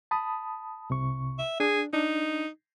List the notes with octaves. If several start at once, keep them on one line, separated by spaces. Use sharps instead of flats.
A5 B5 D#6
C2 C3 C#6
E5
D4 G#4
D4 D#4